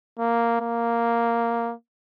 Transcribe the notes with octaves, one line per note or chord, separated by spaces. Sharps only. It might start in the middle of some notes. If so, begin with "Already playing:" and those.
A#3
A#3